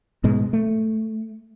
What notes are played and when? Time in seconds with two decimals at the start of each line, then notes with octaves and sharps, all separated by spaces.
0.24 G#2 B2 G#3
0.53 A3